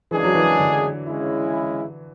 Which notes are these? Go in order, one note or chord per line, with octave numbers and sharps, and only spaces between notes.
F#2 C#3 E3 G#3 D4 G#4
F#3
E3
D3
C#3 G#3 C#4 E4